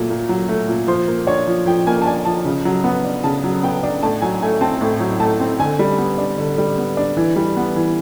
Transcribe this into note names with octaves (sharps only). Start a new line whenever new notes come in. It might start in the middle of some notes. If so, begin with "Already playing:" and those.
Already playing: A#2 F#3 A3
A#2
F#3
A3
A#2
F3 C5
A#3
D4 C#5
F3
F3 G5
A#3 G#5
A5
D4 G#5
F3 A5
C#3
F#3
B3
D4
C#3 A5
F#3
B3 G5
D4
A2 A5
F#3 G#5
A3 G#5
C4 A5
A2
F#3
A3 A5
C4
D3 G#5
G3
B3
D4
D3
G3
B3
D4
E3
G3
B3
E3